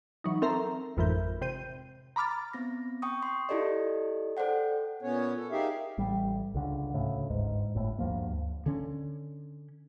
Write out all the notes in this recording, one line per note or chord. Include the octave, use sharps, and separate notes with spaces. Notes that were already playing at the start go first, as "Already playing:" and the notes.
E3 F#3 D#4
C4 A4 A#4 E5 A#5 C6
G#1 F2 A2 E3 A#4 G6
C3 C5 G6 D#7
A#5 B5 D6 F6 A6
B3 C4 A#6
G5 C#6 D#6
C6
E4 F4 G4 A4 D5 D#5
A4 C5 D5 F#5 G5
A#2 B3 C#4 C#5
A4
D#4 G4 G#4 A#4 E5 F5
A1 G3
C#2 D3
D2 A2 C#3
G1 G#2
G1 A2
D2 G2 F3 A#3
D3 C#4